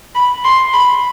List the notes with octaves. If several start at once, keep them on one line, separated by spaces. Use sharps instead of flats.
B5
C6
B5